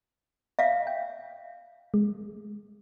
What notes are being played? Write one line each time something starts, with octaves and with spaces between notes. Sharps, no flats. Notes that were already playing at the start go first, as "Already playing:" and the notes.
E5 F5
G5
G#3